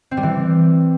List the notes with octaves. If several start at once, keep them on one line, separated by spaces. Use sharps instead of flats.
C4
G3
E3